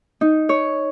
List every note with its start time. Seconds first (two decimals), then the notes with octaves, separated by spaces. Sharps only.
0.21 D#4
0.49 C#5